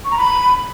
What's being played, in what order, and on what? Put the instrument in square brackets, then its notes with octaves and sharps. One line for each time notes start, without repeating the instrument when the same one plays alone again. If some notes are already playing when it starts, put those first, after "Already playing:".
[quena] C#6
A#5
B5